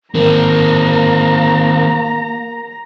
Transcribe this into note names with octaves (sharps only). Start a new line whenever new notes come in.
D#3 A#3 C4 A#4 A#5